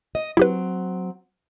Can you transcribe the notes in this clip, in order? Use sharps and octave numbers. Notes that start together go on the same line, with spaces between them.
D#5
F#3 C4 E4 G4 B4